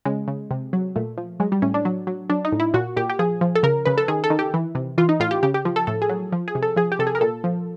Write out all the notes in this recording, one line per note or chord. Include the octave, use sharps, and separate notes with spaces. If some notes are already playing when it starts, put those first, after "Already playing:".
C#3 G#3
C#3
C3
F#3
A#2 A3
F3
F#3 G#3
G3
A2 C#4
D4
F#3
F#3
F#3 D4
D#4
A2
E4
A#2 F#4
A#2 G4
G4
F3 G#4
F3
A4
C#3 A#4
C#3 B4
A4
D#3 G#4
A4
D#3
G4
E3
C3
E3 F4
D#4
A2 F4
G4
C#3 G4
G4
F3
A4
A2 A4
G#4
F#3
F3
G#4
C3
A4
F3 G#4
G4
C3 A4
G#4
A#4
A#2 A4
F3